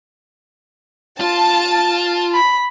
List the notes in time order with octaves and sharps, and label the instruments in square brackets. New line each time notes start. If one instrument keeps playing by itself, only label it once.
[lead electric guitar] F4 [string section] A5
[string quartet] B5